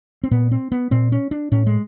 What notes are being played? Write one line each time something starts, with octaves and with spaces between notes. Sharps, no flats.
C4
A#2 B3
C4
B3
A#2 C4
C#4
D4
A2 C#4
G#3